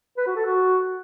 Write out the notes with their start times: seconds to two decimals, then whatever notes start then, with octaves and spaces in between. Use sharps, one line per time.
0.18 B4
0.27 F#4
0.36 A4
0.46 F#4